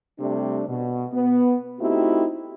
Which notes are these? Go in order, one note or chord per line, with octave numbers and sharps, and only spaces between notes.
C3 G3 A3 D4
B2
B3
A3 C4 D#4 E4 F#4 G4